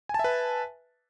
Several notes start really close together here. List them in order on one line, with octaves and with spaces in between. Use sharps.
G#5 A5 E5 B4